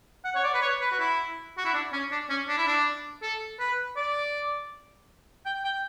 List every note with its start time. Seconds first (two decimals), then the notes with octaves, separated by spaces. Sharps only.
0.25 F#5
0.35 C#5
0.44 D5
0.54 B4
0.62 C#5
0.81 B4
0.92 F#4
0.99 E4
1.58 F#4
1.65 E4
1.74 D4
1.93 C#4
2.11 D4
2.30 C#4
2.48 D4
2.58 E4
2.67 D4
3.22 A4
3.59 B4
3.96 D5
5.45 G5
5.64 G5